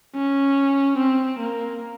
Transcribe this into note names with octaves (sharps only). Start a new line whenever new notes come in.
C#4
C4
A#3